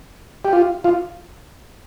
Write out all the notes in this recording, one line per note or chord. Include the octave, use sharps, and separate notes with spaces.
G4
F4
F4